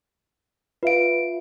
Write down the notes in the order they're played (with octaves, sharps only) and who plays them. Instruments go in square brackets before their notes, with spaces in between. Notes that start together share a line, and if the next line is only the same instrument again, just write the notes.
[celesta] F4 E5 F5 [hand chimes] B4 D7